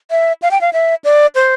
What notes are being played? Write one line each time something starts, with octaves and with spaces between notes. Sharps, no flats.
E5
F5
G5
F5
E5
D5
C5